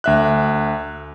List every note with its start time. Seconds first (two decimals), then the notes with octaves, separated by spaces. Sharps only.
0.04 D2 E5 F#6